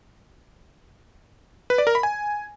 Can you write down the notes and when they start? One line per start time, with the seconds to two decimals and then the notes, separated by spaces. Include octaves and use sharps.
1.70 B4
1.78 D5
1.87 A#4
1.95 B5
2.03 G#5